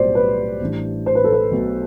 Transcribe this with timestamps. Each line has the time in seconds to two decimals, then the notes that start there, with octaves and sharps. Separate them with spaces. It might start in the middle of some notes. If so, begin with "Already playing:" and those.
Already playing: B1 A2 G3 B3 F4 C5 D5
0.15 B4
0.60 A1 A2 E3 G3 D4
1.06 C5
1.15 B4
1.24 A4
1.32 B4
1.51 B1 B2 A3